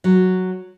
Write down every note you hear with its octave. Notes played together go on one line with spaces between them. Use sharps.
F#3